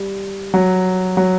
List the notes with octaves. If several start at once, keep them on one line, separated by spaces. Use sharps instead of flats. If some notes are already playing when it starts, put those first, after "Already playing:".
Already playing: G3
F#3
F#3